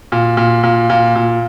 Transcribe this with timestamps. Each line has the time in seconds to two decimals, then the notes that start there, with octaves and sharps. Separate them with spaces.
0.12 A#2
0.37 A#2
0.63 A#2
0.90 A#2
1.15 A#2